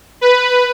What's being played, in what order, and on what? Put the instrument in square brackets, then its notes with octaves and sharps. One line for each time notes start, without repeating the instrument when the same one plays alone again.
[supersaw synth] B4